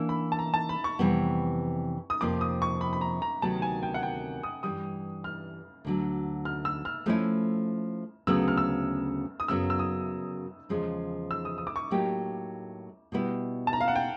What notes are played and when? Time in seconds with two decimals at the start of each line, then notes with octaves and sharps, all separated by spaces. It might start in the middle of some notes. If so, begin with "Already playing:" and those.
Already playing: E3 A#3 D4 E6
0.09 B5
0.32 A5
0.39 A#5
0.54 A5
0.69 B5
0.84 C#6
0.99 F2 C3 E3 G3 B3
2.10 D#6
2.21 F2 C3 F3 A#3 D6
2.41 D#6
2.62 C#6
2.81 B5
2.93 B5
3.01 A#5
3.22 A#5
3.42 D2 C3 D#3 F#3 B3 A5
3.62 G#5
3.83 G5
3.94 F#5
4.03 G5
4.43 D#6
4.63 G2 E3 G3 D#6
5.24 F6
5.85 D2 D3 F#3
6.45 F6
6.65 E6
6.85 F6
7.06 F3 A3 C#4 E4
8.27 D2 C#3 F#3 B3 E6
8.48 F6
8.58 E6
9.40 D#6
9.48 F#2 C#3 F#3 B3 E6
9.70 E6
9.79 D#6
10.69 E2 C#3 F3 G#3 C#4
11.31 E6
11.45 D#6
11.58 D#6
11.67 D6
11.76 C#6
11.91 A2 F#3 A#3 D#4 G4
13.12 B2 G3 B3 E4
13.67 A5
13.73 A#5
13.81 F5
13.88 F#5
13.96 G5